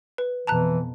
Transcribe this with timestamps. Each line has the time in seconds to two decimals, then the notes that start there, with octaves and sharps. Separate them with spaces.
0.18 B4
0.47 F2 B2 E3 A5 A#5 F#6